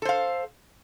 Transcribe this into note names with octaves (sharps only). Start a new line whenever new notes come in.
A4 C5 F5